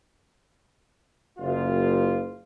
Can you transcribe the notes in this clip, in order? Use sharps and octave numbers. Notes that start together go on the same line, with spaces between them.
F#1 F4